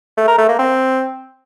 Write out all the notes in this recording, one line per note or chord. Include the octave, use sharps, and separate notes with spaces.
A3
A#4
A3
A#3
C4